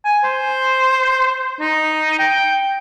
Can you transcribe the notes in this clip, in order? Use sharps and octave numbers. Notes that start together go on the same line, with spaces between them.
G#5
C5
D#4
G5